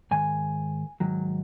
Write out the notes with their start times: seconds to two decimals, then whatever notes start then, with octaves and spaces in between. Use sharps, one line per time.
0.11 G#2 D#3 G#5
1.00 G#2 D#3 F#3